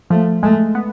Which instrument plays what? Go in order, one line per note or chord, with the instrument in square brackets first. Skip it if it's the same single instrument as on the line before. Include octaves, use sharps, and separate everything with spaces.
[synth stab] F3 [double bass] A3
[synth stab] G#3 [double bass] A3
[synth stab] B3